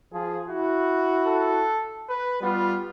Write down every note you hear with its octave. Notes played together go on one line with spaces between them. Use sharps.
F3 G#4
E4 F#4
A4
B4
G3 B3 F4